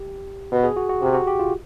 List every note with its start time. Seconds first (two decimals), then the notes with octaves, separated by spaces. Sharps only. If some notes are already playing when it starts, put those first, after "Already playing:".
Already playing: G4
0.52 B2
0.64 G#4
0.76 F#4
0.89 F#4
1.02 C3 G4
1.14 F#4
1.27 G4
1.39 F4